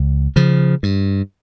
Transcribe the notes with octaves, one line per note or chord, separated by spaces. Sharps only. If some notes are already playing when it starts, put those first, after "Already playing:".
Already playing: C#2
C#3 F3
G2